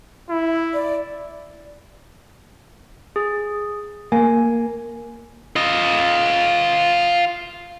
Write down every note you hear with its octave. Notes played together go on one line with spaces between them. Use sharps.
E4
D5
G#4
A#3 G#5
F4 D#5